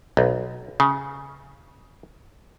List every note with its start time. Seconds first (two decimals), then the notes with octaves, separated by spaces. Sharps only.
0.17 B1
0.80 C#3